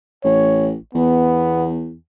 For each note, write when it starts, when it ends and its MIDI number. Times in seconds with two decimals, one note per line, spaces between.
0.24 0.75 33
0.24 0.70 73
0.95 1.95 40
0.95 1.69 59